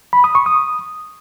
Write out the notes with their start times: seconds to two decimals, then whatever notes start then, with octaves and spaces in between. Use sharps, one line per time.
0.13 B5
0.24 D#6
0.35 C#6
0.46 D#6